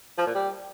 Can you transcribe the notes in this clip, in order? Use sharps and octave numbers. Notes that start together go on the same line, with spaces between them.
F3
A#2
G3